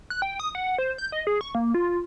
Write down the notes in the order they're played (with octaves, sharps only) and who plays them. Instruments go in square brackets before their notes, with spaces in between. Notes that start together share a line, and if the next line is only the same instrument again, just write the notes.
[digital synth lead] F#6
G5
D#6
F#5
C5
G6
D#5
G#4
C#6
A#3
F4